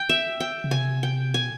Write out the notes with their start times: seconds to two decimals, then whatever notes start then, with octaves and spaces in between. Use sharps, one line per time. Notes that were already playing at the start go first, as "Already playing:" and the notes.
Already playing: G5
0.09 E5
0.40 G5
0.64 C#3
0.71 C3 G#5
1.03 G5
1.34 B2 G#5